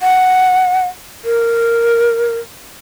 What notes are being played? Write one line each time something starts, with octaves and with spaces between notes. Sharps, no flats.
F#5
A#4